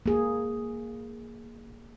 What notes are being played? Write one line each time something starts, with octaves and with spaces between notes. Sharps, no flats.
A#3 G#4